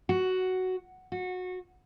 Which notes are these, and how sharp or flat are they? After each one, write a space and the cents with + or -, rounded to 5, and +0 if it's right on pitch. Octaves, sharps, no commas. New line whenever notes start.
F#4 +5
F#4 -20